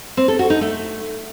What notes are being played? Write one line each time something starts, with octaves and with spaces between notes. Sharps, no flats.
C4
A4
F#4
D#4
A3